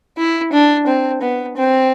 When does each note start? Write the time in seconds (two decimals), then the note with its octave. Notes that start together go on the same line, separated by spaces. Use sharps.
0.17 E4
0.53 D4
0.87 C4
1.22 B3
1.56 C4